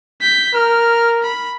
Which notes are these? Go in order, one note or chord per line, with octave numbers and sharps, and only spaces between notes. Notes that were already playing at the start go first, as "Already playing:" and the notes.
G6 B6
A#4 F6
B5